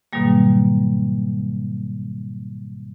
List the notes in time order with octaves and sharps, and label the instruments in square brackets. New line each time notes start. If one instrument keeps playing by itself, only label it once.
[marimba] G#2 B2 D#3 F#3 G3 A#3